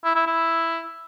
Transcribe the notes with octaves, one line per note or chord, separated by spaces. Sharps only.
E4
E4
E4